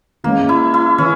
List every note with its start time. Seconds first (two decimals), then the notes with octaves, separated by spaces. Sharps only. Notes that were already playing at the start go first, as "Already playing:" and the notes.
0.24 E3 G#3 A#3 C#4
0.49 E4
0.74 E4
0.98 E3 C#4